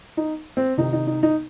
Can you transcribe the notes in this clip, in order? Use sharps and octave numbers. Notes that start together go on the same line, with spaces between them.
D#4
C4
C3 D#3 D#4
D#4
D#4
D#4